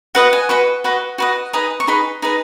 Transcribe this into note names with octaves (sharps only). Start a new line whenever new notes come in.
F#4 B4 D#5 F#5
G#5
F#4 B4 D#5 C#6
F#4 B4 D#5
F#4 B4 D#5
D#4 G#4 B4 D#5
C#6
D#4 G#4 B4 D#5 B5
D#4 G#4 B4 D#5